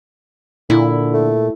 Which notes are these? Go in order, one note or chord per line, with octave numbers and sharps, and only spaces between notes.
A#2 D3 E4
A3